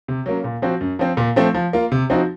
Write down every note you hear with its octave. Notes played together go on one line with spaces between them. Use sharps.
C3
F#3 A#3 C#4
A#2
F3 C4 F#4
F#2
F3 C4
A#2
F3 A3 C4
F3
A#3 F4
C3
F3 C4 D#4 F#4